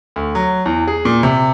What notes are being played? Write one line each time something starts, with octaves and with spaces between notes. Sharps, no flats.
D2
F#3
E2
G#4
A#2
C3